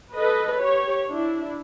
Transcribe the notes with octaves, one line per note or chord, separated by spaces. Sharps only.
A4 B4 D#5
G4 C#5
D4 E4